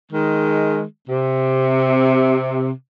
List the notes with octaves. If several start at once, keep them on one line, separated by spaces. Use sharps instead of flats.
D#3 G#3
C3